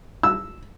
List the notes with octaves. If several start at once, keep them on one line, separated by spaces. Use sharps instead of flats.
E6